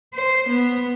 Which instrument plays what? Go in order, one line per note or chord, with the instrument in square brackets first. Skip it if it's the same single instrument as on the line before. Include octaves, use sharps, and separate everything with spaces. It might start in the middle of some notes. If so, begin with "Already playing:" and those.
[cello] C5
B3